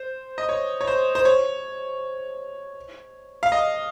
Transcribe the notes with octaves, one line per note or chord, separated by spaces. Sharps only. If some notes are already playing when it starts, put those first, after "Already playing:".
Already playing: C5
D#5
C#5
C#5
C5
C5
C#5
F5
D#5